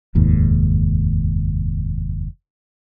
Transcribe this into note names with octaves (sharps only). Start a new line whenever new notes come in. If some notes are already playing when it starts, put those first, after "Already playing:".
F1 D#2 G#2